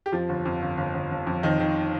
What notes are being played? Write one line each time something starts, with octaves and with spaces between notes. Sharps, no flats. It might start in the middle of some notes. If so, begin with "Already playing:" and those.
G4
F2 F3 F4
G1
F2
G1
G1
G1
G1
F2
F2 D#3 D#4
D#3